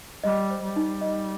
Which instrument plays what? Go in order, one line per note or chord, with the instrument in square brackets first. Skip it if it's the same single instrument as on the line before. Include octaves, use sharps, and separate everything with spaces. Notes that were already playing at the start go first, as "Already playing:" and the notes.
[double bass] G3 [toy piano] D#5
[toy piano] C5
[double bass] G3
[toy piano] D#4
D#5